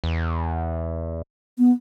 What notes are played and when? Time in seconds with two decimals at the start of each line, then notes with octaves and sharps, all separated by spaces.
0.04 E2
1.58 B3